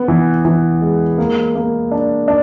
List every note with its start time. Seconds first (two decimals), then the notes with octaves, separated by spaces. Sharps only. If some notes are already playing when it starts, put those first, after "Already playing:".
Already playing: B3
0.08 E3
0.45 E3
0.81 G#3
1.18 A#3
1.55 A#3
1.91 D4
2.28 D4